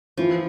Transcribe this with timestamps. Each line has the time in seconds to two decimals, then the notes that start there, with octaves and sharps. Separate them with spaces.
0.17 E3 F3